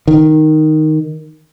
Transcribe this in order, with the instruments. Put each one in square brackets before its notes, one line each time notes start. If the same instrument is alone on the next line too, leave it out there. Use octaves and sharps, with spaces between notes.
[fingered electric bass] D#3